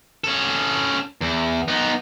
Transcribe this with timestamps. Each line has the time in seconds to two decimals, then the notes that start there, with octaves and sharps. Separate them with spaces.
0.24 C#4 A4
1.21 E2
1.68 B3 D#4